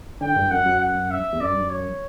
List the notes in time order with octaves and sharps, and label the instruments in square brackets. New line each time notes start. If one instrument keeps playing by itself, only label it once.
[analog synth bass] D3 [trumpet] G5
[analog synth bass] G2
[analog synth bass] F#2 [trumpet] F#5
[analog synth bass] F#2
[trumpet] F#5
E5
[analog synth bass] E2
[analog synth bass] F#2 [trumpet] D5
[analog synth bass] G2
F#2
[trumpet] C#5